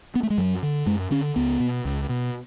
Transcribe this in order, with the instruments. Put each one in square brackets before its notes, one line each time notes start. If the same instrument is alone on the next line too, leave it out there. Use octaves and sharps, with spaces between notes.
[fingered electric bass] B3
A3
G#3
F#2 F#3
D3
F#2 G#3
D3 C#4
C#2 B3
B2
C#2
B2